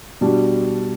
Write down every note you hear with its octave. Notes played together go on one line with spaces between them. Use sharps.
B2 G3 D4